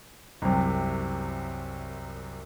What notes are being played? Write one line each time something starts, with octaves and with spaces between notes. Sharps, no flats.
C2 F#2 C3